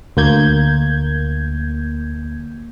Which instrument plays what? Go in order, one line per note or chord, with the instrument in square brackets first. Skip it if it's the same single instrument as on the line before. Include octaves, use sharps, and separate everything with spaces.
[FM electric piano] D2 A#3 G6 G#6